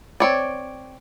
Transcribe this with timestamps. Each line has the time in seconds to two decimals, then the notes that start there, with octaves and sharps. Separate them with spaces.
0.20 C4 C#5 D5